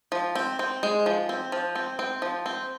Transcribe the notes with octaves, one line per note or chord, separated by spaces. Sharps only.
F3
C4
C4
G#3
F3
C4
F3
C4
C4
F3
C4